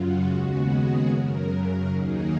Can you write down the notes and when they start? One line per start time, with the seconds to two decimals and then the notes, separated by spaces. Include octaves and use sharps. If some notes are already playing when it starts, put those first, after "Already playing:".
Already playing: F#2 C#3 F#3 F4 F#4
0.25 D#2 C#3 G#3 B3
0.66 G#4
1.07 F#2 C#3 F#3 A#4
1.49 A#4
1.90 D#2 D#3 F#3 A#3 D#4 G#4